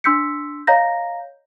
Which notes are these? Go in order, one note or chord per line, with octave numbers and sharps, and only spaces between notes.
D4 C6 E6 G6 B6 C#7
C#5 D#5 F5 A#5 G6 A#6